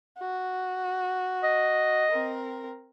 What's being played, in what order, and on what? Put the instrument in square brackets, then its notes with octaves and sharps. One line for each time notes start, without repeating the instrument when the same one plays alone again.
[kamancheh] F#4
[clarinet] D#5
[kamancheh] C4 A#4